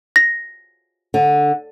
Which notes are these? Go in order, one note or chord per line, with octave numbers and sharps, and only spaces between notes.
A#6
D3